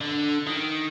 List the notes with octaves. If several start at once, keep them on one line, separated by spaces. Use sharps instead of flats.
D3
D#3